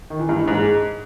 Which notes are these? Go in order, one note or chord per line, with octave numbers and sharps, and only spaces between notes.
D#3
E3
G2
E3
G#2